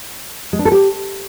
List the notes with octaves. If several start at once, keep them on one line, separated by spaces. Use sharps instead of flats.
G#3
D4
A4
G4